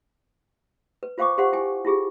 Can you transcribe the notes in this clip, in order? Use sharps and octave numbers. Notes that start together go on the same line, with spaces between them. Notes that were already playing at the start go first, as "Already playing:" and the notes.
B4
F4 C5 F5 G5 C#6 D6
G4 C5 F5 F#5 C6
E4 G5 G#5
E4 F4 G4 G#4